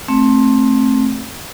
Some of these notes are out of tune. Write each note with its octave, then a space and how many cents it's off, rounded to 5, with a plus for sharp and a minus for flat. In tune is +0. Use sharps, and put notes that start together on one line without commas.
A3 +0 C4 +20